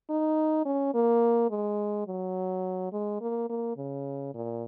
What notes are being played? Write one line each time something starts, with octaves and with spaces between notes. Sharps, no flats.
D#4
C#4
A#3
G#3
F#3
G#3
A#3
A#3
C#3
A#2